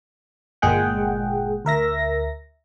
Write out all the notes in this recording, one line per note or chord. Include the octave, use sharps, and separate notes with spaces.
G1 A#2 G#3 G#4 F#5 G5
D2 A#4 E5 A#6